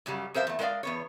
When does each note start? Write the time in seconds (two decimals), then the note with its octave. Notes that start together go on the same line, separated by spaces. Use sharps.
0.06 F#2 C#3 F#3 G3
0.34 F2 A#4 C5 E5 F5
0.47 E2 A3
0.59 G#3 A3 A#4 D5 D#5 F5
0.83 E2 B3 C#5